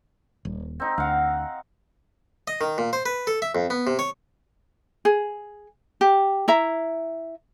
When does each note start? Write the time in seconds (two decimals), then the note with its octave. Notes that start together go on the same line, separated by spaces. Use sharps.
0.45 D#1
0.80 C4 D#4
0.98 D2 F5 F#5
2.48 D#5
2.61 D#3
2.78 A#2
2.93 C5
3.06 B4
3.27 A4
3.42 E5
3.55 F2
3.70 B3
3.87 C3
3.99 C#5
5.05 G#4
6.01 G4
6.48 E4 E5 A#5